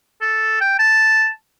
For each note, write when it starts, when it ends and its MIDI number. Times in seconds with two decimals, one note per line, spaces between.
0.22 0.58 69
0.61 0.74 79
0.79 1.29 81